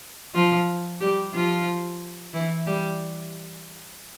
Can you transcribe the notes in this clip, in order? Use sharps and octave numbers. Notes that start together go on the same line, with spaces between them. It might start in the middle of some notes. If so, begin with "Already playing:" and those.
F3 F4
G3 G4
F3 F4
E3 E4
G3 G4